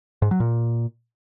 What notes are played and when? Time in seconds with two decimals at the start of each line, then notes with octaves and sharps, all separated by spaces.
0.22 G#2
0.31 F#3
0.40 A#2